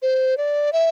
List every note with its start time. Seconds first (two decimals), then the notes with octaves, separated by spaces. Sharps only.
0.02 C5
0.37 D5
0.73 E5